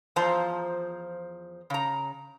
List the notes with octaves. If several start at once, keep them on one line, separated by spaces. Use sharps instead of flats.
E2 F3 F4 C5 A5 A#5
C#3 A#5